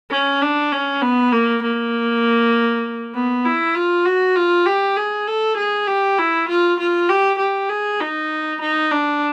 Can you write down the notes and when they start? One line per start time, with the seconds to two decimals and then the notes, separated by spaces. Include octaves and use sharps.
0.11 C#4
0.42 D4
0.72 C#4
1.02 B3
1.33 A#3
1.63 A#3
3.15 B3
3.45 E4
3.75 F4
4.05 F#4
4.36 F4
4.66 G4
4.97 G#4
5.28 A4
5.57 G#4
5.87 G4
6.18 E4
6.49 F4
6.79 F4
7.09 G4
7.39 G4
7.70 G#4
8.00 D#4
8.61 D#4
8.91 D4